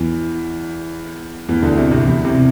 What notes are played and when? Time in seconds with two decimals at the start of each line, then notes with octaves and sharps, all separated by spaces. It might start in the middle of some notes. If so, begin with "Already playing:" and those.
Already playing: E2 E3
1.48 E2 E3
1.63 D2 D3
1.77 C2 C3
1.91 C2 C3
2.05 E2 E3
2.25 C2 C3
2.35 C3